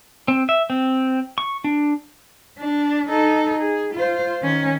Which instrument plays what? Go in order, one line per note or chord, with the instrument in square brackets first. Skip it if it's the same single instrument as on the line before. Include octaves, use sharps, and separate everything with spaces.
[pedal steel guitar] C4
E5
C4
C#6
D4
[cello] D4
D#4 A4
G#4
F4 C5
D#3 C#4